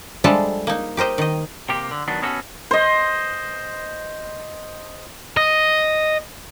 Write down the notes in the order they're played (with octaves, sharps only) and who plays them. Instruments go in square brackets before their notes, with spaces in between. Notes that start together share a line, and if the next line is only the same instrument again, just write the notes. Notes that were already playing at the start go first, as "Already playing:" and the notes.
[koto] F3 G3 G#3 D4 A4 E5
A#3 D#4
G4 A#4 C5 D#5
D#3 D#5
[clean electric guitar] C3 A#3 G4
D3
D#3 F#3 B3 D4
B3 C#4 F#4 A4
[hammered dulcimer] C5 D#5
[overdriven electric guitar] D#5